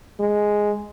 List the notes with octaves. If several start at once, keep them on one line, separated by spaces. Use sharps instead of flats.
G#3